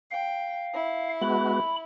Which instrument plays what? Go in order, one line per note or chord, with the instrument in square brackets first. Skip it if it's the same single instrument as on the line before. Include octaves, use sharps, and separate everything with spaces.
[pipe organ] F5 [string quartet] G5
[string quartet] E4
[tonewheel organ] G#3 B3 F#4 [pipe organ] B5